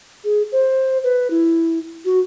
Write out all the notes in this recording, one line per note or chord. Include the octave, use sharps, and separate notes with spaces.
G#4
C5
B4
E4
F#4